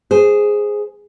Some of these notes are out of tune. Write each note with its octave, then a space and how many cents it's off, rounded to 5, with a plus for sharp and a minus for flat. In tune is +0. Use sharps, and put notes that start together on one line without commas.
G#4 -5 C5 +0